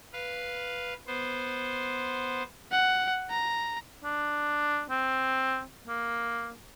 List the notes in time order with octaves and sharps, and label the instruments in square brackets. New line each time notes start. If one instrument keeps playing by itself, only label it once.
[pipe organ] B4 F5
B3 C5
[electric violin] F#5
A#5
[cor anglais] D4
C4
A#3